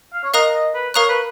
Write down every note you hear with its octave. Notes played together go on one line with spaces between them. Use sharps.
F5
C#5
A#4 D#5 F5 A#5 D#6 F#6
D#5
B4
A#4 C#5 F5 A#5 D#6 F#6
B4